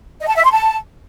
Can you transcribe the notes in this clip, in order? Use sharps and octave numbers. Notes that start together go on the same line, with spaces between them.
D#5
A5
E5
C6
A5